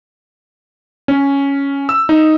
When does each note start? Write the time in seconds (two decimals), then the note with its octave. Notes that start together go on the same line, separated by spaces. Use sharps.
1.08 C#4
1.89 E6
2.09 D#4